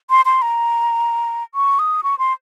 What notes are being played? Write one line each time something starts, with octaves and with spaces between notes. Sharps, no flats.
C6
C6
A#5
C#6
D#6
C#6
C6